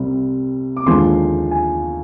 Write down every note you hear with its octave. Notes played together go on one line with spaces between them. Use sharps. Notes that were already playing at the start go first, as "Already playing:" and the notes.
Already playing: C2 C3 G3 C4
D6
D#2 D3 F3 G#3 C6
G#5